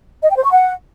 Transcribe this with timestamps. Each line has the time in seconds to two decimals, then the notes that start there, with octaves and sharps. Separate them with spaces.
0.23 D#5
0.30 G5
0.37 C5
0.44 C#6
0.51 F#5